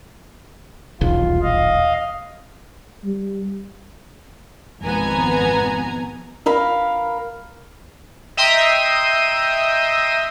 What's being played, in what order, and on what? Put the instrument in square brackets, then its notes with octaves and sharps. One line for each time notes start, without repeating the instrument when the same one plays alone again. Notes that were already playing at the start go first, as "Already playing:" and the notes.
[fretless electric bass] D#1 B1 E2 [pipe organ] F4
[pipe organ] D#5 F5
[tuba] G3
[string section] G#1 F2 B2 B3 G#5 A#5
[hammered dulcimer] A#4 F5 B5
[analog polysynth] D#5 E5 G5 A#5 C6 D#6